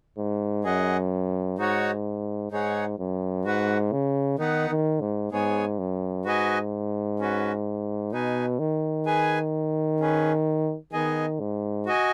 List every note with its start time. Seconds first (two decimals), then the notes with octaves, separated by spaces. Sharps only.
0.18 G#2
0.64 F#2 G#4 D#5 F#5
1.58 G#2 D#4 F#4 C#5 F#5
2.51 G#2 D#4 G#4 C#5 F#5
2.98 F#2
3.45 G#2 F#4 B4 F#5
3.92 C#3
4.38 D#3 B3 D#4 B4 F#5
4.69 D#3
5.01 G#2
5.32 G#2 B3 G#4 C#5 G#5
5.79 F#2
6.25 G#2 F#4 B4 D#5 G#5
7.20 C#4 F#4 B4
8.12 B2 D#4 B4 G#5
8.59 D#3
9.06 G#4 B4 G#5
10.00 C#4 G#4 B4
10.92 D#3 B3 G#4 D#5 G#5
11.40 G#2
11.86 F#4 D#5 G#5